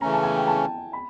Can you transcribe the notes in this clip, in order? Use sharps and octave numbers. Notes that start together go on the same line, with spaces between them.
C#3 E3 A3 C#4 A#5
A5
G#5
G5
A5
B5